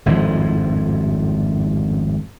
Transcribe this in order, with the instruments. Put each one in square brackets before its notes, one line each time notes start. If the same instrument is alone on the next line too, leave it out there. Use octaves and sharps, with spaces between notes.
[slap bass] G#1 F2 A2 F3